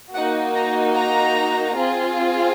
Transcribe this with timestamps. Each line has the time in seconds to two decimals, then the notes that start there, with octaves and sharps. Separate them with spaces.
0.14 A#3 D#4 F#4 F#5
0.54 A#5
0.96 A#5
1.76 C4 F4 G#4